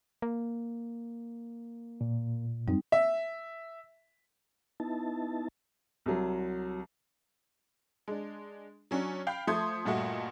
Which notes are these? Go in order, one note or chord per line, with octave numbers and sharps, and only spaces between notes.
A#3
A#2
F#2 G3 C4 D#4
E5
B3 D#4 E4 A5
C2 F#3
G#3 D4
F#3 C#4 D4
F5 G5 B5 G6
F3 A3 C6 D#6 G6 G#6
G2 A#2 A3 F#4 D#5